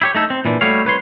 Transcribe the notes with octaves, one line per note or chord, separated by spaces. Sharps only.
E4 G4 C#5
A3 D#4 A4
C4
A#2 E3 D4
G3 A3 F#4 C#5 F5
C2 B4 C#5 C6